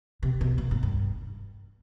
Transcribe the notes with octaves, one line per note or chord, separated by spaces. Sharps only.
C3
B2
B2
G#2
G2